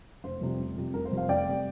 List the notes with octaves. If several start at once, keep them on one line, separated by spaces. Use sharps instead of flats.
F1 C5
F2 C3 G3
F1
F2 C3 G3
F1 A#4
C5
F2 C3 G3
C5 F5
F1 D5 G5
C3 G3